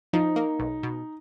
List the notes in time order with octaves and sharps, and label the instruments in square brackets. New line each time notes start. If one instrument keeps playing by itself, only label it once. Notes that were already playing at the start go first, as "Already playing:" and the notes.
[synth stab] F3 [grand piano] D#4
[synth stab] A#3
B1
B2